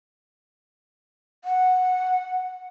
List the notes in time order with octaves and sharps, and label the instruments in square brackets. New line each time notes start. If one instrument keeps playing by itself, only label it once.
[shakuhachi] F#5